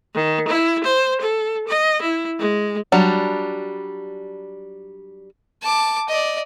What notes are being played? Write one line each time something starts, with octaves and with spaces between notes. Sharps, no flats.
D#3
E4
C5
A4
D#5
E4
G#3
F#3 G3 D4
A5 D6
D5 D#5